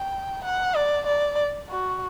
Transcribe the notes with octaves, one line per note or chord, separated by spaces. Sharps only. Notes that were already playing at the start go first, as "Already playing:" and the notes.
Already playing: G5
F#5
D5
D5
F#4